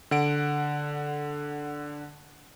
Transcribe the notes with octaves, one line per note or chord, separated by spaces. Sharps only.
D3 F#5 D7